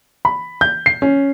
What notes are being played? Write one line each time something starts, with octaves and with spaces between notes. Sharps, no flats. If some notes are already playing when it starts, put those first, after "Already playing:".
B5
G6
C7
C#4